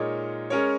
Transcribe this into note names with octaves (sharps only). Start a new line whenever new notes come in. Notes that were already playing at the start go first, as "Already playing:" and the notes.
Already playing: A#2 G#3 D#4 A#4 C#5
G#3 C#4 A#4 C#5